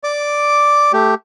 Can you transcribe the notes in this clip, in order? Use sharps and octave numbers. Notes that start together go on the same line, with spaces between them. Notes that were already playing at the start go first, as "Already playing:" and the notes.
D5 D6
A3 G4